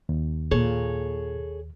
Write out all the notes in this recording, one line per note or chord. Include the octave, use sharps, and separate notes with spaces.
D#2
A#2 G#4 A4 C#5